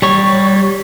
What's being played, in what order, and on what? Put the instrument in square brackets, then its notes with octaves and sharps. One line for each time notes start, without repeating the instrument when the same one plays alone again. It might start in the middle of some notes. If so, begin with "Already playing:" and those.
[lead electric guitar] G3 C#5